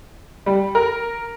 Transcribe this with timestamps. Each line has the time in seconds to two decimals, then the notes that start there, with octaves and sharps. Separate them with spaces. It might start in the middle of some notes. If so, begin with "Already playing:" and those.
0.46 G3
0.75 A#4